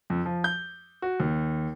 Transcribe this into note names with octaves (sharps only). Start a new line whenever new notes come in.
F2
F3
G6
F#4
D#2